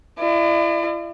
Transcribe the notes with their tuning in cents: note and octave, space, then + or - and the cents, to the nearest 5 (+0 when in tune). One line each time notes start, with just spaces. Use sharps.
E4 +35 D5 +45